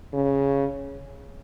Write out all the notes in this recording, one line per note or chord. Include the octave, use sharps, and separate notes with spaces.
C#3